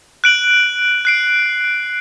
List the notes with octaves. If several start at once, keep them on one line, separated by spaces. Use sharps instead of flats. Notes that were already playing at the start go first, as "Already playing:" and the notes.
F#6 D7 F#7
F#6 C7 D7